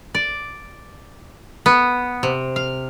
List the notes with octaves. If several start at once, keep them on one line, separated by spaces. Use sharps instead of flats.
D5
B3
C3
F5